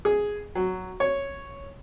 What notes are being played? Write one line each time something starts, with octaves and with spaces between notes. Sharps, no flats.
G#4
F#3
C#5